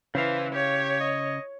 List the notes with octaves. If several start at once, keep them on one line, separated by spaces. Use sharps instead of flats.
C#3 E3 C5 F5
G4 C#5
D#5